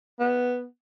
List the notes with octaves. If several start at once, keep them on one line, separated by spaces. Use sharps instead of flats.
B3